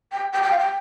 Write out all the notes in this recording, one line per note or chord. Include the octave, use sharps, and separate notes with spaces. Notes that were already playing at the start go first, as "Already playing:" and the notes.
G5
G5
G5
F5
G5